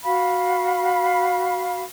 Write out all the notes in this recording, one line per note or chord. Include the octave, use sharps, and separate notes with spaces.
F#4 F5 B5